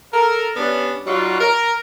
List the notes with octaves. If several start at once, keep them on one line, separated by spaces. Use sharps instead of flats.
A4 A#4
G3 B3 C#4 D4
F#3 G3 D#4 F4 F#4
A#4